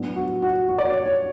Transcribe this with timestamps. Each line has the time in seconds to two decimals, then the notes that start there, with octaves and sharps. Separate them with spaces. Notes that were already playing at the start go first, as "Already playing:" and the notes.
Already playing: A2 F#3 B3 D4
0.16 F#4
0.42 F#4
0.69 F#4
0.78 D5
0.87 C#5
1.06 C#5